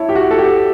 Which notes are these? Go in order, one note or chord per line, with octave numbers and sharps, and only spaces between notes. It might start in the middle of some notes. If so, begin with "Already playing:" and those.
Already playing: E4 C#5 A5
G4
F#4
A4
G4